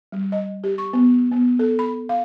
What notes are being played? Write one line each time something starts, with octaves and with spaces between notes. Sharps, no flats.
G3
D#5
G4
C#6
B3
B3
A4
B5
F5